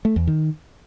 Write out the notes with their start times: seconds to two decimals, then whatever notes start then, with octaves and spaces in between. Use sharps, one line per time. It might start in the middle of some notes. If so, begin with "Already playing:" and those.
0.05 A3
0.16 E2
0.27 D#3